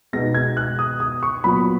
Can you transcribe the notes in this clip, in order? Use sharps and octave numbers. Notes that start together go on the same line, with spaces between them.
B2 G#3 B3 D#4 A#6
G#6
F#6
D#6
D#6
C#6
A#2 F#3 B3 F4 B5